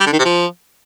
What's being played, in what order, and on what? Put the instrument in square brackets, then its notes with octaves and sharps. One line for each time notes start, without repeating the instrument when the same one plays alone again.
[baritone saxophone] G3
D3
D#3
C3
F3